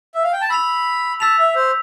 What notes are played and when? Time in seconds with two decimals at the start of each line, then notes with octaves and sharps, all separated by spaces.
0.14 E5
0.23 F5
0.33 G5
0.41 A5
0.49 B5 E6 B6 F7
1.20 A5 E6 B6 F7
1.39 E5
1.55 C5